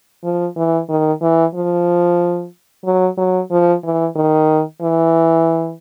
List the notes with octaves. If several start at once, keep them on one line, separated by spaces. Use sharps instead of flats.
F3
E3
D#3
E3
F3
F#3
F#3
F3
E3
D#3
E3